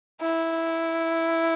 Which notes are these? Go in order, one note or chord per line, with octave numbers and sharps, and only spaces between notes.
E4